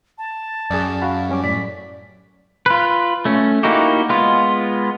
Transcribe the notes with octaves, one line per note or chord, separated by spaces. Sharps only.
A5
F#2 G#4 D5
F#4 F5 B5
G3 C#4 D6
A2 D5 B6
F4 B4
A3 C#4
A#3 D#4 E4 F#4 G4
G#3 B3 F4